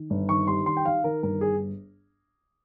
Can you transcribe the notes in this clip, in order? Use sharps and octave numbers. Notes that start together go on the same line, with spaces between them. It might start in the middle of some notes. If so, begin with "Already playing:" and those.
Already playing: D#3
G1
D#3 C#6
G3 C6
D#3 C6
G5
D#3 F5
D#3 A#4
G1 A#4
G#4